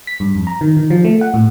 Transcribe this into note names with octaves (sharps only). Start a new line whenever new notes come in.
B6
G2
F2
A#5
D#3
D#3
F3
A3
F#5
A2